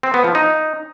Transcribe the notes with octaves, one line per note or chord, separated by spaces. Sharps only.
C4
B3
F3
D#4